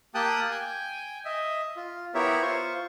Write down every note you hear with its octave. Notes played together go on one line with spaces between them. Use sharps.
A#3 G4 G5 A5 D#6 F#6
G5 G#5
D#5 E5
F4
B3 E4 G4 A#4 C#5 E5
F4 C5 C#6